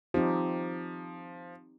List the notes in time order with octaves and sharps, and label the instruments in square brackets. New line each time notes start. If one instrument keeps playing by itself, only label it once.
[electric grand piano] F3 [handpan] C4 D#4 G4